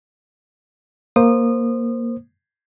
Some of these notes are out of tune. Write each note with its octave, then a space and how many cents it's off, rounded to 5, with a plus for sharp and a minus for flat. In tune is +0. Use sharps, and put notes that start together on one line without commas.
A#3 +5 C5 +0 D#6 -25